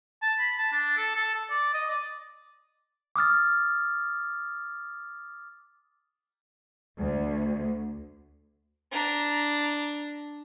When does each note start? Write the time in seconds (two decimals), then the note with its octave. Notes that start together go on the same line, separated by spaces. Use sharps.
0.22 A5
0.38 B5
0.58 A5
0.72 D4
0.97 A4
1.16 A4
1.34 A4
1.50 D5
1.74 D#5
1.89 D5
3.16 D6 D#6 F6 A6
6.99 D2
8.91 D4 A#5